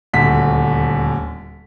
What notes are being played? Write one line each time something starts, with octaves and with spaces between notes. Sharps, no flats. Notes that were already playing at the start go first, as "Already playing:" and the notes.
D#1 D2 B6